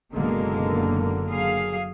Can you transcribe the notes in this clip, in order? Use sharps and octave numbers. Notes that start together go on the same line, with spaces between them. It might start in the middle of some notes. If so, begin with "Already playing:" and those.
F#1 B2 D3 G#3 A#3
F#3 G#4 F5